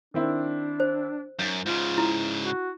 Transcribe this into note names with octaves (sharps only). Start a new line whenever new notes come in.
D#3 C4 D4 E4
C5
F#2 G6 A6
G#2 C#3 F4
E4
F#4